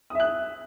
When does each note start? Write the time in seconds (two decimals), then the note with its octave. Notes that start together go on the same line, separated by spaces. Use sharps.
0.10 D#6
0.15 E5
0.20 F#6